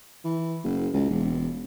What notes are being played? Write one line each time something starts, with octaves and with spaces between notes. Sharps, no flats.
E3
F#1
C#2
E1